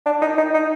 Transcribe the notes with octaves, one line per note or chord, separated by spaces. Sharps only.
D4
D#4
D#4
D#4